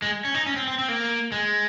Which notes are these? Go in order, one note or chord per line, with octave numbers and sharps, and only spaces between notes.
G#3
C#4
D#4
C#4
C4
C4
C4
A#3
G#3